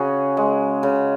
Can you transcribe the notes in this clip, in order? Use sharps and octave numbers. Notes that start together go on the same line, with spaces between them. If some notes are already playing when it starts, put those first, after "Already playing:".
Already playing: C#3 F#4 G#4
G#3
C#3